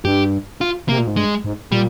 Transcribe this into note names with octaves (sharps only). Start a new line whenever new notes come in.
G2 G4
F4
C3 A#3
A#2
G#2
G2 G#3
G#2
A#2 G3